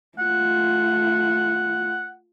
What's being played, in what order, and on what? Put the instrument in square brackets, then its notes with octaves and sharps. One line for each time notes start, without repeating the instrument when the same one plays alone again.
[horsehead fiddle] A3 F4 [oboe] F#5